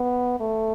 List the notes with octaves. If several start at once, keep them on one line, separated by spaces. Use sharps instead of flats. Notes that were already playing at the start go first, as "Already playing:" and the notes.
Already playing: B3
A3